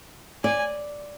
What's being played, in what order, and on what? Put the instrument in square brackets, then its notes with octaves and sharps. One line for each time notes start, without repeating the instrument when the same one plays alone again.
[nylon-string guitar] D5 [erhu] G#5